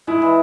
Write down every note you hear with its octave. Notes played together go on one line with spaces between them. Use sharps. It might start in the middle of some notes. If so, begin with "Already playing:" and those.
G#3 E4
E3